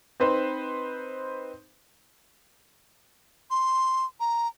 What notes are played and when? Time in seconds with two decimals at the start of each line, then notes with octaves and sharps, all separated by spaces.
0.20 C4 D#4 B4 C5
3.51 C6
4.20 A#5